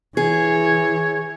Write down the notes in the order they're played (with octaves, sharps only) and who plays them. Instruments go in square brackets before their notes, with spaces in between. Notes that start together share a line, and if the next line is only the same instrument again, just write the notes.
[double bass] E3 [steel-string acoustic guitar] G#4 [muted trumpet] C#5